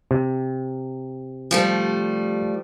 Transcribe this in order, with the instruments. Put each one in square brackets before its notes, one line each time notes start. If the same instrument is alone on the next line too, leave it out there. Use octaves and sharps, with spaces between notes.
[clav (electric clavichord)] C3
[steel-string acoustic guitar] F3 G3 A3